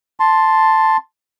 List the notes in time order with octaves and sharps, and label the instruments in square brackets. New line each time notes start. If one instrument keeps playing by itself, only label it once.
[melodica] A5 C6